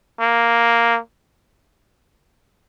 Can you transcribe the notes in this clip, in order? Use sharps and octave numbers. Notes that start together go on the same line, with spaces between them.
A#3